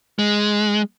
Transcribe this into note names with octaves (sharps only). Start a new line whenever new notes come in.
G#3